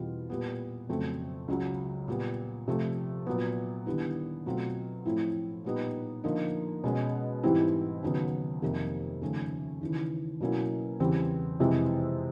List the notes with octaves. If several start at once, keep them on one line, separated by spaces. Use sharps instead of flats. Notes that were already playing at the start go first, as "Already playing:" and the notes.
Already playing: E2 B2 G3 C4 F4
A#2 G3 B3
F2 C#3 F#3 A3 C4
C#2 C#3 F#3
A#2 G3 B3
C3 F3 A3
A#2 F#3 B3
D#2 D3 G3 B3 E4
B2 F#3 A3 C4 F4
A2 F3 A3 C4 E4
A#2 G3 B3 D#4
D3 F3 A#3 D#4
B2 G#3 C#4
G#2 E3 G3 C4 E4
D#2 C#3 F#3 B3
F2 C3 D#3 G3 A#3
D#2 C#3 F3 A3 C#4
D#2 C#3 E3
B2 F#3 A#3 C#4 E4
E2 C#3 E3 G3 C4
F2 C3 E3 G#3 C4